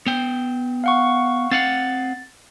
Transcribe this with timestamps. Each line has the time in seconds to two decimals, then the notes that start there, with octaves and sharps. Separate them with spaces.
0.06 B3 G5
0.84 F5 F#5 C#6
1.51 C4 F5 F#5 A6